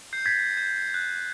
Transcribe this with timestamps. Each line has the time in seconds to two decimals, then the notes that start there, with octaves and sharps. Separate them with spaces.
0.13 G6 C7
0.26 G#6 A6 B6
0.57 G6
0.94 F#6